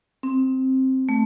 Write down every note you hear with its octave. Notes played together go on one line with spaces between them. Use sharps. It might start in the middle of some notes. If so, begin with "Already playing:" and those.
C4
A3